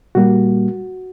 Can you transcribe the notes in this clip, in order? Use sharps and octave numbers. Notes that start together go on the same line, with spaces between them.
A#2 G3 A#3 F#4